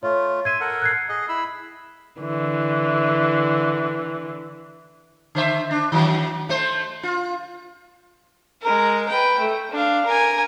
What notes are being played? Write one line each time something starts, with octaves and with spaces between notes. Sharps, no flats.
A3 F4 C#5
E5 C6 G#6 D#7
A4 A#4 F#5
F#6 G#6 C7
G#4 D#5
E4 B5 E6
D3 E3
D3 C5 E5
D4
D#3 F#3 A3
A3 C5
F4
G#3 A#4
B4 G5
A3
D4 F5
A#4 G#5